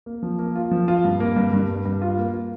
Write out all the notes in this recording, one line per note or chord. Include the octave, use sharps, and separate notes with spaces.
A#3
F3
A#3
F4
F3
F4
G2
A#3
G2
G2
G2
G2
F4
A#3
F4